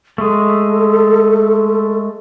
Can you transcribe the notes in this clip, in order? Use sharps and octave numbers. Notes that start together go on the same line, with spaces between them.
G#3 A3 A4